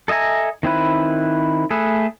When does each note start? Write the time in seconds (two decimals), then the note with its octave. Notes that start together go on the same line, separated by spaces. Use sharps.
0.08 A4 D#5 E5 G#5 A#5
0.63 D#3 C4 E4 B4
1.71 A3 G#4 A4 B4